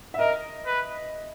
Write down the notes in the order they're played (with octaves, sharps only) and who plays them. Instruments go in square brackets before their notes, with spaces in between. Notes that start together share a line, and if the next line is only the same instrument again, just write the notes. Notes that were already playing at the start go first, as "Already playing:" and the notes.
[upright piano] E5
[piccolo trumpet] A#4 [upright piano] D#5
[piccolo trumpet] B4